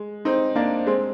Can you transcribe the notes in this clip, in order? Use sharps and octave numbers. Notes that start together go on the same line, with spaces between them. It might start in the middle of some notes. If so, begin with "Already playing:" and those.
Already playing: G#3
C4 D#4
A#3 D4
G#3 C4